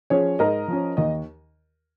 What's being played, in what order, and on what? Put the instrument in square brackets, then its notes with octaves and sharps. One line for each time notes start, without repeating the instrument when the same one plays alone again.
[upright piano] F3 C#4 G#4 C#5
G#2 A#4 D#5
F3 C#4
D#2 D#5